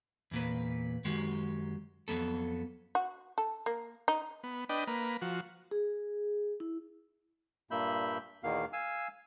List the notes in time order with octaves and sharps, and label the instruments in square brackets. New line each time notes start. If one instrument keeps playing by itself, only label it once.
[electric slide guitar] E2 A#2 B4
F#2 D#3 G#3 F#4 G4
F2 B2 F#3 B3 A4
[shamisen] F#4
A4
A#3
D#4
[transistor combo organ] B3
D4 B4 D#5 G5
A#3 B4
F3 F#4
[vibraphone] G#4
E4
[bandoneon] G2 A#2 A#3 E5 B5 G6
E2 B2 D#3 A#3 F5
F5 G#5 E6